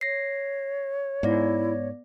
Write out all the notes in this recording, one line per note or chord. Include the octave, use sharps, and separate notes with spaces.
C#5 A#6 C7
G#2 B3 E4 D5 A#6